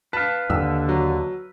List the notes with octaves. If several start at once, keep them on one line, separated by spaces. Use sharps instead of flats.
B4 F5 A5
D#2 D3 E6
F#3